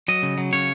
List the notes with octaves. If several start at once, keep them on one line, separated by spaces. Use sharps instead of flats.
F#3 D#5
C#3
F#3
C#3 C#5